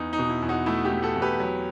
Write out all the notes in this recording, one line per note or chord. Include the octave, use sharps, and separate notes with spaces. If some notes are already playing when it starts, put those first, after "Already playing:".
Already playing: E2 D#4
D#4
B2
E4
E2
D#4 F#4
A3 E4
E4 G4
A3
F#4 A4
E2
G4 B4
F#3